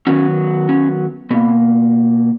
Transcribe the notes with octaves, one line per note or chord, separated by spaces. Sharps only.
D#3 F#3 B3 C#4
C#4
B2 A#3 B3